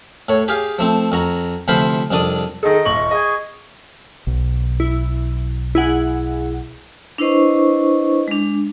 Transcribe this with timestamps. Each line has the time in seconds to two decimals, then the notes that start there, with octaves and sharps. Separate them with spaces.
0.29 A2 C#5
0.48 G4 G#4 F5
0.79 F3 A3 C4
1.12 F2 F#4 A#5
1.68 D2 C3 F3 F4 C5 B5
2.11 C2 F2 D4 D5 D#6
2.63 D#3 G#4 A4 D#5
2.86 D#1 C#6 F#7
3.11 G#4 D#5
4.27 B1
4.80 E4
5.75 E4 G#4 F#5
7.18 D4 E4 B4 C5 D#5 C#6
8.28 G#3 D4